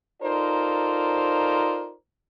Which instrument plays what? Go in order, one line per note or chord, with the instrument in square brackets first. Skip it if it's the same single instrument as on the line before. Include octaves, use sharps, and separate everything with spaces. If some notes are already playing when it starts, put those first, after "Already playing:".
[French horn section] D#4 F4 A4 A#4 C5 D5